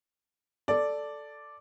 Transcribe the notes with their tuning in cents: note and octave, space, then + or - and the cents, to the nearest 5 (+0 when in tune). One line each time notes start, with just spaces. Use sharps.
A4 +0 D5 +0